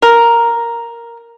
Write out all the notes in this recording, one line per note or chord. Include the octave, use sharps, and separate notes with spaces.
A#4